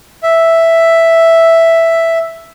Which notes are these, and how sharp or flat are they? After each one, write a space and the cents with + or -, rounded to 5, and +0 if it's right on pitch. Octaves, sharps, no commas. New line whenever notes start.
E5 +0